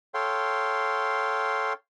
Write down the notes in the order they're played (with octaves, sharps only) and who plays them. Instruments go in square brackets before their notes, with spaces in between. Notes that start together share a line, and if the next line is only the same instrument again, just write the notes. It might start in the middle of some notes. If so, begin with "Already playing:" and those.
[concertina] A4 C#5 F5 G5 C6